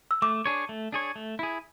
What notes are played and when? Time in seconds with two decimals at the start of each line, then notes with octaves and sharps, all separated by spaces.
0.11 E6
0.22 A3 D6
0.46 D4 G#4 C#5
0.69 A3
0.92 D4 G#4 C#5
1.16 A3
1.39 E4 G#4